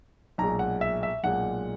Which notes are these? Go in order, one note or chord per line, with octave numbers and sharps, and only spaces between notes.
B1 A#2 G#3 A#5
F#5
E5
E5
B1 A#2 G#3 F#5